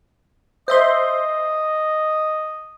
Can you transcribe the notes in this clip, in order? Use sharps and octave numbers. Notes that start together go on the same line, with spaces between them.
C5 D#5 E5 C6